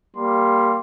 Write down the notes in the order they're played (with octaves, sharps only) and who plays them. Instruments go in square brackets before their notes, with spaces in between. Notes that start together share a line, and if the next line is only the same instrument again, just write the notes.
[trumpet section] G3 A#3 C6